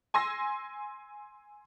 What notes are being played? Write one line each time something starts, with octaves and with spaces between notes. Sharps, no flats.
G#5 C6 E6 A#6